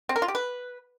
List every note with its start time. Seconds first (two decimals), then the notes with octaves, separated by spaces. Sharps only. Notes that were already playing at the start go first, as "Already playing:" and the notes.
0.09 C4
0.16 A#4
0.22 F4
0.28 G4
0.35 B4